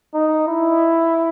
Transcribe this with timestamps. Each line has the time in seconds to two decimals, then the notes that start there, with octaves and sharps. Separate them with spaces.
0.14 D#4
0.47 E4